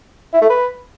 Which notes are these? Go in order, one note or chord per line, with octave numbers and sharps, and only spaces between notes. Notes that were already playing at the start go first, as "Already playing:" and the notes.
E4
A3
B4